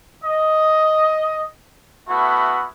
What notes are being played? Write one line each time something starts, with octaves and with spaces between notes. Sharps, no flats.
D#5
A3 B3 E4 F#4